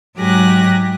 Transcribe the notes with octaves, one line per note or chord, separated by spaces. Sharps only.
G#2 F#3 G4 G#5 F#6 A#6